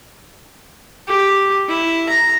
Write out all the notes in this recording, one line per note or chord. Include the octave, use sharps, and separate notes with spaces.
G4
E4
A#5